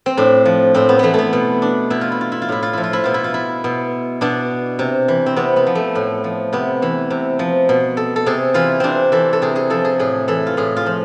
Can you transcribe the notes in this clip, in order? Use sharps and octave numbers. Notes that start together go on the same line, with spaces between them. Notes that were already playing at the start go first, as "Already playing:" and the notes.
C4
A2 D4
F3
A2 C4
B3
E3 A3 B3
A3 B3
B2
D4
B2 E4
F4
E4
F4
E4
F4
A2 E4
F4
F3 E4
F4
E4
B2 F4
E4
F4
E4
B2
B2 D4
C3
E3
C4
C3 B3
B3
F3
A3
A2
F3
C3 B3
E3
C3
F3
B2
A4
A4
C3 G#4
E3 F4
C3 C4 D4
E3 A4
A4
C3 G#4
G#4
F3 A4
G#4
A2 G#4
E3 A4
F4
A2 G#4
F4
F3